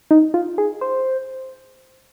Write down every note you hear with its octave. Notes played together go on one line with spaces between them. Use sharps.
D#4
F4
G#4
C5